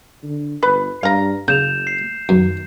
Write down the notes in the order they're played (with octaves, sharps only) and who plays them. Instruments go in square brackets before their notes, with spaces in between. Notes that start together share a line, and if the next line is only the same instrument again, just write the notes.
[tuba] D3
[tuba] G1 [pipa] B4
[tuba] G2 [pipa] F5 A#5
[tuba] F#1 [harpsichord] C#3 [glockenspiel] G6 E7 F7
[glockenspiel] C7
[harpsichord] F#2 [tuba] D#3